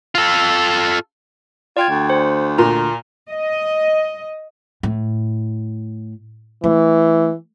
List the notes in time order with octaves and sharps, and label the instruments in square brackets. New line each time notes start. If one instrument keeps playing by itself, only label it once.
[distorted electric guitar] F4 A4
[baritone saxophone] F4 [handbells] D5 G5 G#6
[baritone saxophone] D2
[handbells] C5
[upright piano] A#2 [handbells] A#5
[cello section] D#5
[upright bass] A2
[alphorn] E3 [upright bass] A3